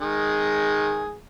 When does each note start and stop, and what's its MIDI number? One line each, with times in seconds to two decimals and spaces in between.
0.01 1.15 51
0.01 1.15 56
0.01 1.15 68